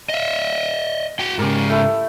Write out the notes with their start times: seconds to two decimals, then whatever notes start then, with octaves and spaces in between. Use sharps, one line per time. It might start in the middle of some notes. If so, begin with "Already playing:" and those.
0.09 D#5 E5
1.19 F#4 G5
1.39 G#2 C#3 G4 A#4
1.69 A3 E4